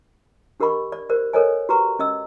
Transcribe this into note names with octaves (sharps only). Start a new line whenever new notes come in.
D4 G4 A#4 D#5 B5 C#6
D5
G4 A#4 C5 D5
A4 A#4 C5 C#5 D#5 G#5
F#4 G4 B4 A#5 C#6
C#4 D#5 E6